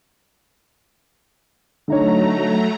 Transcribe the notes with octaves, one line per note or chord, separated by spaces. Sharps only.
D3 F#3 A3 D#4 C#5 A#5